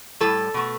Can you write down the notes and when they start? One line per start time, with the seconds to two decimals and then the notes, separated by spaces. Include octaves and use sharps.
0.21 A2 G3 A4
0.54 B2 A3